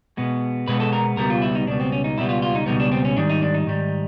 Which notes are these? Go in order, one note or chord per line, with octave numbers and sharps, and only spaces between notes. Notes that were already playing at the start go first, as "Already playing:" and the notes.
B2 G#3 B3
B2 G#3 B3 B4
A4
A#4
C#2 B2 G3 B3 A#4
F4
E4
D#4
C#2 B2 G3 B3 D4
C4
C#4
D#4
C#2 B2 G3 B3 E4
F4
F4
D#4
C#2 B2 G3 B3 D#4
D4
C4
C#4
G#2 D#3 G3 D4
D#4
D4
D#4
G#2 D#3 G3